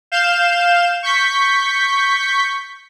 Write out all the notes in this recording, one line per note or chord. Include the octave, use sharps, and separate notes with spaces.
F5 G6 E7
C#6 G6 B6